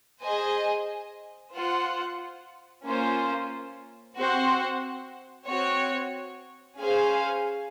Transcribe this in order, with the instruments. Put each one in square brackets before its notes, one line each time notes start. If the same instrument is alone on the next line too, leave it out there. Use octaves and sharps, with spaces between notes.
[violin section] G#4 C5 D#5 G#5
F4 C5 F#5
A#3 C#4 F4 C5
C4 F#4 C5 F#5
C4 F#4 C#5
C#4 G#4 C5 F5 G#5